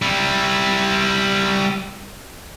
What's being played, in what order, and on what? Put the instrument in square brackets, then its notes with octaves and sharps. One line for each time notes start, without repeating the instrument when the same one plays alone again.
[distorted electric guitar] G3 E4